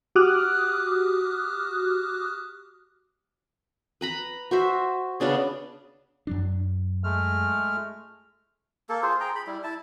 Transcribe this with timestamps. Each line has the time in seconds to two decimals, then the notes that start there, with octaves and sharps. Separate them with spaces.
0.15 F#4 G4 D6 D#6 F6 F#6
4.01 B4 A#5 B5
4.51 F#4 C5 E5
5.20 C#3 B3 D4 G#4
6.27 F#2 F#3 D4
7.04 G#3 A3 F6
8.89 A#3 A4
9.03 F4 G#4 C5
9.20 G#4 G5 A#5
9.35 B5
9.47 G3 E4
9.64 E4 A5